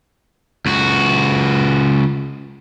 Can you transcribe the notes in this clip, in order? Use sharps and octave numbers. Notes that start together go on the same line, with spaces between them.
C#2 F#4